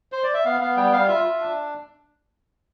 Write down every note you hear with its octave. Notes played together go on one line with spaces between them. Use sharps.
C5
D5
E5
B3 F5
B3 F5
G3 G5
G3 F5
F4 E5
F4
D4